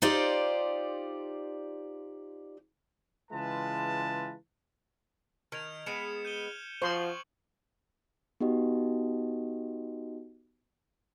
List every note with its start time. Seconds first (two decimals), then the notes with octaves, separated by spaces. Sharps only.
0.02 D#4 F4 G4 C5 D5 F5
3.31 C#3 E3 G#3 F4 B4 A5
5.52 D#3 F6 G#6 F7
5.86 G#3 B3 C#7 E7
6.25 G6 D#7 G7
6.82 F3 F#4 C5 C6 C#6 D#6 F#7
8.41 B3 D#4 F#4 G4 D#5